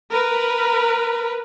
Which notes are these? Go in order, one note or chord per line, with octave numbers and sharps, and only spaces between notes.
A#4 B4